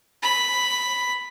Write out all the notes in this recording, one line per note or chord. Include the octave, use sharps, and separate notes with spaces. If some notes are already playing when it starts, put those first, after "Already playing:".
B5